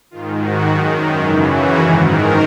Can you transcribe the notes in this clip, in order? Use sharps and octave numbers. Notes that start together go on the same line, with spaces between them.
G#2 D#3 F4
F#4
F#2 D#3
F#2 C#3 E3
F#4
G#2 D#3 G#4
A#4